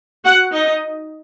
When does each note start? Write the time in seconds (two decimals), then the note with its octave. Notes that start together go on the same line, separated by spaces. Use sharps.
0.24 F#4 F#5
0.52 D#4 D#5